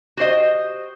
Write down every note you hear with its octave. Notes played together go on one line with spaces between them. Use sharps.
F#4 G4 C5 D#5